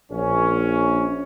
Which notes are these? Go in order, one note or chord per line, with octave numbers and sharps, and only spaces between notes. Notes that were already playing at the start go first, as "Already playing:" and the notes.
A#1 C#4